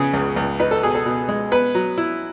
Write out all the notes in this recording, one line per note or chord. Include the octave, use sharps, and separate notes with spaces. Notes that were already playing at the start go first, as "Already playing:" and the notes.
Already playing: C#3 B3 G#4
C#2
C#2
D#4 B4
A4
B2 G#4
A4
B2
G#3
B3 B4
F#3
E4